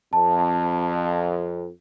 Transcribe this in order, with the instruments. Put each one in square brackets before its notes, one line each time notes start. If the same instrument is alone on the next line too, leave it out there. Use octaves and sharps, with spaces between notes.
[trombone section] F2 [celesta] A5